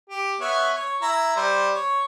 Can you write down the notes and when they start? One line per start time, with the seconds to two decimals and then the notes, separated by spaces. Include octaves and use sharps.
0.09 G4
0.40 B3 C#5 E5
0.75 C#5
1.01 E4 A#5 E6
1.36 G3 C5
1.74 C#5